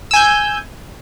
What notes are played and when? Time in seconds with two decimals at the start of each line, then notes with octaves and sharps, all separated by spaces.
0.11 E6
0.14 G#5
0.16 G6